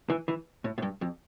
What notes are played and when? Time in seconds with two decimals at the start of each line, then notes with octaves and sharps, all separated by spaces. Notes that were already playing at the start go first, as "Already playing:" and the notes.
0.10 E3
0.28 E3
0.64 A2
0.78 A2
0.82 G2
1.01 F2